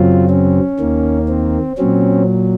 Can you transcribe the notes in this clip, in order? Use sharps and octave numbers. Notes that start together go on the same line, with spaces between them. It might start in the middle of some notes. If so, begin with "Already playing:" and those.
Already playing: F#2 C#3 F#3 C4 F4
C#4
D#2 D#3 A#3
C4
A#2 F#3 C4 C#4